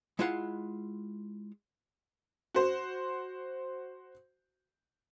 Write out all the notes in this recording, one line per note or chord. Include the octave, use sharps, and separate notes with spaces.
G#3 E4 F4 F5 F#5
F#4 C5